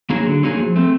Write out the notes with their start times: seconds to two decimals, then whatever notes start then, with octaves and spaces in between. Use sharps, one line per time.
0.10 F#3 A#3 D#4 G#4
0.27 D3
0.43 F#3 A#3 D#4 G#4
0.60 F3
0.76 A3 C4